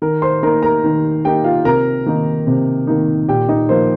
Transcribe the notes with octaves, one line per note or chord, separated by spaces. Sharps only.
D#3 A#4
C5 C6
A#3 D#4 A#4 A#5
A#4 A#5
D#3
A#3 D#4 G4 G5
F4 F5
C3 A#4 A#5
D#3 A#3 D#4
C3
D#3 A#3 D#4
A#2 G4 G5
D#4 D#5
F3 A#3 D#4 C5